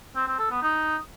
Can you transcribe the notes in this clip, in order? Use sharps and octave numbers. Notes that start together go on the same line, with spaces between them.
C4
C4
A4
B3
D#4